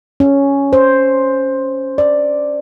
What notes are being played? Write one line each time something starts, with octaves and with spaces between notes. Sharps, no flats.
C#4
C5
D5